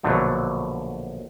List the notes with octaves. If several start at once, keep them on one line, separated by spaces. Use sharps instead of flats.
A#1 B2 D3 F#3 A3